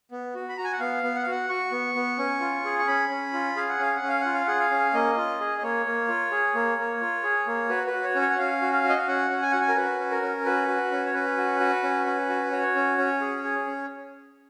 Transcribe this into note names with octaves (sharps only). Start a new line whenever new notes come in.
B3
F#4
B5
F#4 A#5
G#5
F#5
B3 F5
B3
F#5
F5
F#4 F#5
F#4 C#6
B3
B3
C#4
F4
G#4
C#6
C#4 B5
C#4
F4
G#4 F5
F#5
C#4 F5
F#5
C#4
F5
F4 F#5
F5
G#4 F#5
F5
C#4
A#3 D#5
F4
G#4
D#5
A#3 C#5
A#3
F4
G#4
A#3
A#3
F4
G#4
A#3
F#4 B4
B4
F#4
C#5
C#4
C#5
F#5
C#4 F5
F#4
F5
F#4
D#5
F5
C#4 F#5
C#4
G#5
F#4 F#5
G#5
A#4
F#4 B4
C#4
A#4
C#4
F#4 B4
F#4
C#4
C#5
C#4 B4
F#4
F#4
C#4
C#4
F#4
F#4 C#5
C#4
C#4
G#4
G#4
C#4